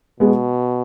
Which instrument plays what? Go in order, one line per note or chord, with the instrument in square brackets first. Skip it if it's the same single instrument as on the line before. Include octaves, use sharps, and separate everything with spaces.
[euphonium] B2 [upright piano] G#3 B3